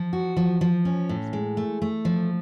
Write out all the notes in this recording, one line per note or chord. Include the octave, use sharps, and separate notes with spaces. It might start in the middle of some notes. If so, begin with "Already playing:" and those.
Already playing: F3
F#4
F3
F3
C#4
A2
G#3
A3
A3
F3